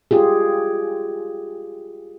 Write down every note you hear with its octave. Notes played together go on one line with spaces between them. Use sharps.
F4 G4 G#4